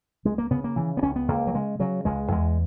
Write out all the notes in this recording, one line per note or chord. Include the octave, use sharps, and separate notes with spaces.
C#2 G#3
A#3
C#3 B3
A#3
C#3 E3
B3
C#2 C#4
B3
C#2 A#3
F#3
C#3 G#3
C#3 F#3
C#2 G#3
E2 G#3